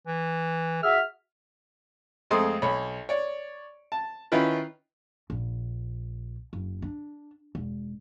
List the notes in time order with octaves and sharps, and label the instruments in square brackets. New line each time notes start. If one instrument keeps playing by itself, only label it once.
[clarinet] E3
[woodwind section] F#4 G#4 E5 [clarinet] F6
[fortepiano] F2 G#3 A3 C4 C6 D#6
B1 C#5 B5
C#5 D5
A5
D#3 C#4 E4 F4 B4
[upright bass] A#1
F#1
D4
E1